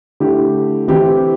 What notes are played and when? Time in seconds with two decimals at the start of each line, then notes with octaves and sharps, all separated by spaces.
0.20 D3 A3 E4 G4
0.88 E3 C4 E4 G4